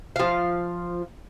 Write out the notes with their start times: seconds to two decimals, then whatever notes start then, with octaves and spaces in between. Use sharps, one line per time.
0.16 F3 F5